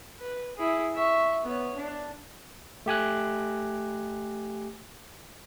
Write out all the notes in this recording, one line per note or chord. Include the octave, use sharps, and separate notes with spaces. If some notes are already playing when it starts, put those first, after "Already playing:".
B4
E4 G#4
E5 C#6
B3 C#5
D4
A3 G4 G#5 F#6